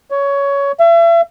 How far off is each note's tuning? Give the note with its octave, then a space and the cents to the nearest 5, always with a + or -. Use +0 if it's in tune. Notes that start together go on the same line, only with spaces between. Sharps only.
C#5 +15
E5 +40